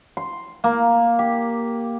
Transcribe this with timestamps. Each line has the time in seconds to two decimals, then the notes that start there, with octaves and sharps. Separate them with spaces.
0.17 C6
0.64 A#3
1.19 G4